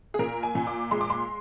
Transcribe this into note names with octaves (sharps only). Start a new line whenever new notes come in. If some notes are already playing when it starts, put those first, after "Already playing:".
G#4
A#2 A#4
G#5
A#2
D6
G#3 C6
D6
C6